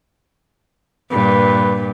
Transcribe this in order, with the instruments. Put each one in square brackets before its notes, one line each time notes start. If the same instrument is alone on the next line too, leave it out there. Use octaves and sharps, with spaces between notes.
[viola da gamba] G2 A#2 [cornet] B4